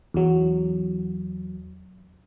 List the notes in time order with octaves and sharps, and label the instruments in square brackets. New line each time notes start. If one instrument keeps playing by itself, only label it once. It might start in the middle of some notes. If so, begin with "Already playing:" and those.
[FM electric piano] E2 F#3